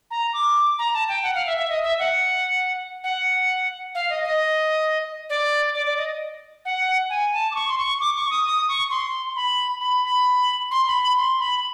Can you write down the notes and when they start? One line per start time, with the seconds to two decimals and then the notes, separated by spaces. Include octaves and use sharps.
0.11 A#5
0.33 D6
0.79 A#5
0.94 A5
1.09 G5
1.23 F#5
1.35 F5
1.46 E5
1.57 E5
1.69 D#5
1.84 E5
1.99 F#5
3.04 F#5
3.95 F5
4.10 D#5
4.24 D#5
5.30 D5
5.75 D5
5.86 D5
5.97 D#5
6.65 F#5
7.10 G#5
7.34 A5
7.51 D6
7.55 C#6
7.69 C6
7.78 C#6
8.00 D6
8.16 C#6
8.31 D#6
8.46 D#6
8.68 C#6
8.90 C6
9.36 B5
9.81 B5
10.04 B5
10.71 C6
10.87 B5
11.02 B5
11.17 C6
11.40 B5